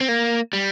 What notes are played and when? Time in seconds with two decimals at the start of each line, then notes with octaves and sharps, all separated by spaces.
0.01 C4
0.08 A#3
0.53 G3